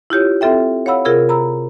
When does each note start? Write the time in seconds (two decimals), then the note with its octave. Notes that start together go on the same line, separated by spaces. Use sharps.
0.10 E4 F4 G4 C#5
0.41 C4 F4 A4 E5 G5
0.86 C#5 F5 F#5 B5 E6
1.05 C3 F4 G#4 A#4 E6
1.29 A#5 B5 E6